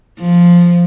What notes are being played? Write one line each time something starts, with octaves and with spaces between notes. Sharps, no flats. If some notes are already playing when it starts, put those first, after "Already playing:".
F3